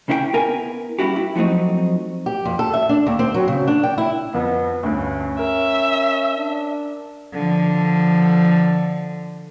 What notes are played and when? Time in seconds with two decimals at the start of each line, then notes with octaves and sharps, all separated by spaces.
0.08 C#2 C3 C#4 E4 G#4 G5
0.33 B3 E4 A#4 B4 G#5
0.99 G3 C#4 E4 F#4 G4
1.16 E4
1.35 F3 F#3 A3 C4 D#4
2.26 G4
2.45 F2
2.59 A4
2.74 E5
2.89 D4
3.07 D#2
3.19 C4
3.34 F#3
3.48 C#3
3.67 D4
3.83 G5
3.98 E4
4.34 F2 B3
4.83 D2 G2 C#4
5.39 A#4 E5
6.37 D4
7.33 D3 F3